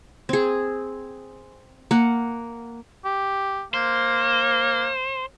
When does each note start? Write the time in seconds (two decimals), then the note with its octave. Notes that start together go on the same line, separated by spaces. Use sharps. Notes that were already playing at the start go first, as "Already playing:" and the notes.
0.29 C4 G#4
1.91 A#3 F#5
3.05 G4
3.74 A#3 C5